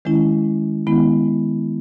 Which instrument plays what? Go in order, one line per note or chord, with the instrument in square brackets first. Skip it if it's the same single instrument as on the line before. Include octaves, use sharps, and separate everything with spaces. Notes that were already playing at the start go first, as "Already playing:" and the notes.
[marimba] D#3 G#3 C#4 E4
D#3 G#3 B3 E4